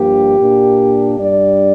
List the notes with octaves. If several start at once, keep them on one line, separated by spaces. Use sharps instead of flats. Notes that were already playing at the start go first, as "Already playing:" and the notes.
Already playing: G2 F3 A#3 D4 G4
A#2 A#3 D4
G2 G3 D4 D5